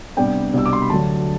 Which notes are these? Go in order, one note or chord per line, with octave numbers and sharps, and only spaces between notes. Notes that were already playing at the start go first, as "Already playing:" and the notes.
C3 G3 B3 D4 G5
C2 B2 G3 D4 E6
D6
C6
B5
D2 D3 F#3 A5